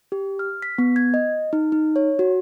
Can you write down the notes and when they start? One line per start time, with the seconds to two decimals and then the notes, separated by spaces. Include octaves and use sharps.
0.12 G4
0.39 F6
0.62 B6
0.78 B3
0.96 G#6
1.14 D#5
1.53 D#4
1.72 D#4
1.96 C#5
2.19 F#4